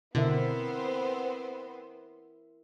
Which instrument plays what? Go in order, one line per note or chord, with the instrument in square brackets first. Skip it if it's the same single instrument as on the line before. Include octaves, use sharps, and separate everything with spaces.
[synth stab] B2 [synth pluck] D3 [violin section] B3 C4 C5 [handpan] E4 A#4 E5